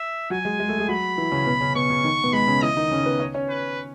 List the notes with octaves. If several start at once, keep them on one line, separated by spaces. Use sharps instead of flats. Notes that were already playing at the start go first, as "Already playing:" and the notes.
Already playing: E5
F#3 F#4 G#5
G#3 G#4
G#3 G#4
A3 A4
G#3 G#4
F#3 F#4 B5
E3 E4
C#3 C#4
B2 B3
C#3 C#4
B2 B3 C#6
C#3 C#4
D#3 D#4
B2 B3
G#3 B5
C#3 C#4
E3 E4 D#5
D#3 D#4
C#3 C#4
B3 B4
C#4 C#5
C#4 C#5
B4